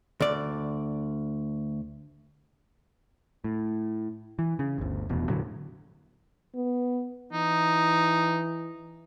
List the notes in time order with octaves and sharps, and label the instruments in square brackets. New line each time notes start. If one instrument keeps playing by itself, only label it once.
[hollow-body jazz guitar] D2 D5
[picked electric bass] A2
E3
C#3
G1 D2
F1 E2 B2
E1 A2 D3 F#3
[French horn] B3
[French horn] E3 [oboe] D#4